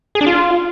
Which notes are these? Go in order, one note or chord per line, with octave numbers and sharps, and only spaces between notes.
G#4
D4
F4